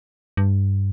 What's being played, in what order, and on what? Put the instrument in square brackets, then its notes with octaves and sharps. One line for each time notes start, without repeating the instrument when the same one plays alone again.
[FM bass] G2